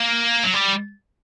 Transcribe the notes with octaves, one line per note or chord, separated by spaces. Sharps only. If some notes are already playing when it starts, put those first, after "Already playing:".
Already playing: A#3
F#3
G3